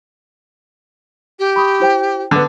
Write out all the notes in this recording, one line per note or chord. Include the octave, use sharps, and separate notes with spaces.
G4
B5 C#6 D#6
E4 C5 G5
D3 B3